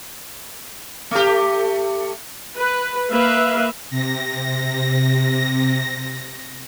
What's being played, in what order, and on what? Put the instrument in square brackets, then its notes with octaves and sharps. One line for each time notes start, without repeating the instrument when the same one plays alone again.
[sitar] A3 G4
[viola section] B4
A#3 B4 E5 F5
[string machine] C3 A#6